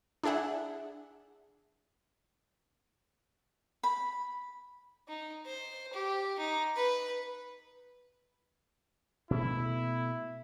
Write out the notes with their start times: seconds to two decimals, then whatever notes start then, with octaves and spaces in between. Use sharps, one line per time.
0.24 D4 E4 G#4 E5 F#5
3.83 B5
5.08 D#4
5.46 C5
5.93 G4
6.38 D#4
6.76 B4
9.31 B2 A3 E4